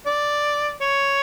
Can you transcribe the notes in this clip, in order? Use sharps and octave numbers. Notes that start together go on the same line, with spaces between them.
D5
C#5